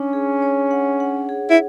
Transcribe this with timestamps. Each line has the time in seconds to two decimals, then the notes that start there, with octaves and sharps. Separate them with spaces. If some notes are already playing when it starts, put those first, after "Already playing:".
Already playing: C#4 D4
0.13 G#4
0.42 C#5
0.71 F#5
1.00 F#5
1.29 G#4
1.50 E4